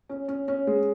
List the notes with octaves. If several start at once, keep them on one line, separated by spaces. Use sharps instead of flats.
C#4
C#4
C#4
G#3